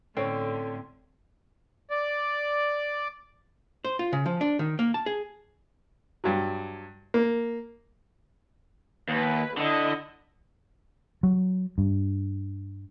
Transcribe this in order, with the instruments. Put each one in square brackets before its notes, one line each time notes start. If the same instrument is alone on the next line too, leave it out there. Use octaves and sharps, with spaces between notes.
[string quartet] A2 D3 [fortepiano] A3 C#4 [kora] C4
[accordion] D5
[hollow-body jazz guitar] C5
F4
C#3
F3
D4
D#3
A#3
A5
G#4
[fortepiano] G2 F#3
A#3
[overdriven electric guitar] D#2 [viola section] B4
[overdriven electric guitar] D3 [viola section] E4 D#5
[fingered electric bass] F#3
G2